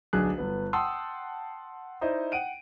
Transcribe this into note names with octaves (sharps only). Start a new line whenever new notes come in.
D1 B1 D4 G#4 F#6
G1 B3
F#5 G5 A5 C6 D#6 E6
D#4 E4 C5 D5 D#5
F#5 G5 D7 D#7